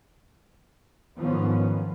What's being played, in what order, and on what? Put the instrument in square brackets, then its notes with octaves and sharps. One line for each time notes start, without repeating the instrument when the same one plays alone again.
[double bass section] G#2 D#3 F3 F#3 B3 C#4